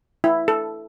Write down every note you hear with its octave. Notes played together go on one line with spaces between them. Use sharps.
E4
A4